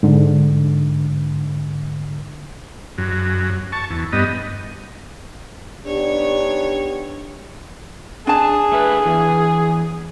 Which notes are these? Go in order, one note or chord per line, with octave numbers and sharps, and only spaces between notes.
G#2 D3
F#2
A5 C#6
E2
G2 B3 D#5
B3 D4 D#4 G4 C#5
D4 G#4 A5
A3 B4
E2 E3